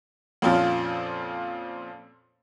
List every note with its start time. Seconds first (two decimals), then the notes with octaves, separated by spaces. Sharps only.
0.42 F2 A#2 F3 C4 C#4 F4